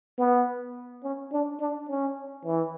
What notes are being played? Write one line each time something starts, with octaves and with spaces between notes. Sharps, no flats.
B3
C#4
D4
D4
C#4
E3